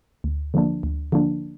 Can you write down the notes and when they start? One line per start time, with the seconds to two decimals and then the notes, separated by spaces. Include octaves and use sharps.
0.24 D2
0.54 D3 F3 A#3 D4
0.83 D2
1.12 D3 F3 A#3 D4